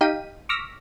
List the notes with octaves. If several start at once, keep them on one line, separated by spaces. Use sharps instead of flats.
D#4 G4 F5 G5 B6 D#7
C#6 D6 E6 F6 A#6 B6